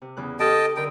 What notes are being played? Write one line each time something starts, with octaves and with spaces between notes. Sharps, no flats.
C3
E2 C#3 F#6
G4 A4 D#5 G5 A5 D#6 F6
D3 A#4 G5 A#5 D#6